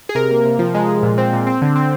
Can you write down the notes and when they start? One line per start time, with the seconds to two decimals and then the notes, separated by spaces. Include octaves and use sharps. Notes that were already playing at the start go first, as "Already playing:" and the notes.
0.09 G#4
0.15 C3 A#4
0.31 A#3
0.45 C3
0.59 F3
0.75 G#3
0.89 G#3
1.03 A#2
1.18 C4
1.33 A#2
1.47 C4
1.62 D3
1.76 C4